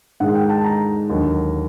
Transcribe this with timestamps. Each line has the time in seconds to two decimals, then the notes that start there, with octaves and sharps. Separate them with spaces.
0.20 G#2 D#3 G#3 F#5
0.35 G5
0.49 A5
0.64 A#5
1.10 D#2 D3 F#3